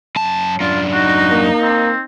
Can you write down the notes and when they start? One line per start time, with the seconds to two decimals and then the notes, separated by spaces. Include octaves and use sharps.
0.16 F#2 A5
0.60 F#2 D4 F4
0.94 D#4 F#4
1.31 A#3
1.62 C4